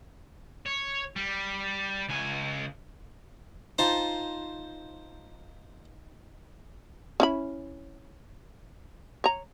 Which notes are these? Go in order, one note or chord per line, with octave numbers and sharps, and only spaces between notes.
C#5
G3
C#2 G#5
D#4 F4 C5 A5
C#4 E4 B5
C#5 A#5